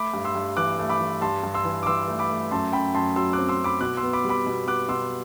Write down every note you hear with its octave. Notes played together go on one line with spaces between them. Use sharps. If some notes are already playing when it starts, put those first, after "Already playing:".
Already playing: A3 B5 D6
G2
C6 E6
G2
E3 D6 F#6
A3
B5 D6
E3
G2 A5 C6
G2
C6 E6
E3
D6
E3 C6 E6
A3
B5 D6
A3
F#2 A5 C6
F#2 G5 B5
F#2 A5 C6
F#3 C6 E6
C4 D6 F#6
C6 E6
F#2
B5 D6
B2 D6 F#6
C6 E6
B3
B5 D6
G3
B5 D6
B2
B3 D6 F#6
B2 C6 E6